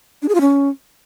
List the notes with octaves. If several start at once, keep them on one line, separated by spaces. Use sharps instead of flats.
D4
G#4
F4
C#4